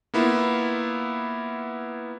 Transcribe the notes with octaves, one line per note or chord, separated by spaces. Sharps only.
A#3 B3 E4 F4